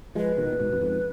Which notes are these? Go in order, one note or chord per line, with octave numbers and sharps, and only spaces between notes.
F3 G#3 B4
B2 D#3
A#2
G#2 B2
F#2
F2 G#2